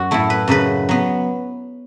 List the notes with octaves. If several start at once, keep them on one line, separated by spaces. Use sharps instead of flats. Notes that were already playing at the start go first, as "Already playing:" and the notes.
Already playing: F#2 F#4
A2 A3 E4
B4
F#2 C#3 F#3 B4
F#3 B3